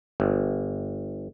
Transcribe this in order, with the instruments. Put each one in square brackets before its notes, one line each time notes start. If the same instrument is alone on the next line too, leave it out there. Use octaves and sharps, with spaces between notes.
[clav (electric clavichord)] G1